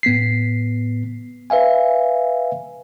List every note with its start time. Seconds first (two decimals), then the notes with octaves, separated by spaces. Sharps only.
0.03 A2 B3 B6 C7
1.50 B4 E5 F5 G#5